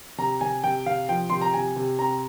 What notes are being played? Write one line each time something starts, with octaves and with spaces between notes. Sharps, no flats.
C3 A#5
C3 G#5
C3 G5
C3 F5
F3 G5
C3 C6
A#5
C3 G#5
C3
C4 A#5